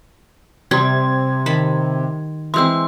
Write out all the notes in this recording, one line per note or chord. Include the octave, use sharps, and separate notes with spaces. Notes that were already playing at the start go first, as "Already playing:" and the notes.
C3 G3 D5 G5 C6 G#6
D#3 A5 B5
E3 G#3 C4 C6 E6